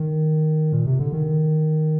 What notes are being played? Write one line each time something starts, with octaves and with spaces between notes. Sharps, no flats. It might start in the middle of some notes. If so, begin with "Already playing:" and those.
Already playing: D#3
A#2
C3
D3
D#3